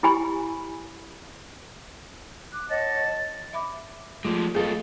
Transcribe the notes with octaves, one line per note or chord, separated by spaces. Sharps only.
E4 G4 G#5 B5
D6 F#6
C#5 D#5 F#5 A5
E5 B5 D6
F3 G#3 A3 F4
F#2 A3 F4 G#4 A4 D#5